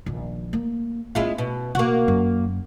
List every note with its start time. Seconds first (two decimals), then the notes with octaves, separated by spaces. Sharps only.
0.06 A#1 D#3
0.53 A#3
1.15 G#3 B3 C#4 E4 F4
1.38 B2
1.75 B2 A#3 F#4
2.08 F#2